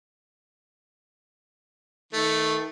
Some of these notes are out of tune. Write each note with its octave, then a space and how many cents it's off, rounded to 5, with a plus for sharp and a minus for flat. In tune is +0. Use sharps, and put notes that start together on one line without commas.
D#3 +25 A3 +0